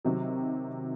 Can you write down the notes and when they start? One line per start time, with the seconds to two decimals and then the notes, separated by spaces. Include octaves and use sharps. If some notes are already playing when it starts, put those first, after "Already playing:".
0.04 C3 D#3 F#3